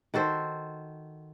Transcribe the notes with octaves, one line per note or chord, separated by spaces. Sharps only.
D#3 F#4 A4 C5